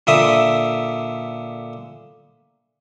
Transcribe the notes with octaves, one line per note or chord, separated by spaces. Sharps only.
A#2 D3 E5 D#6